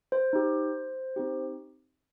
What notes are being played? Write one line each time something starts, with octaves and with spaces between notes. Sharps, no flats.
C5
D#4 G4
C4 D#4 G4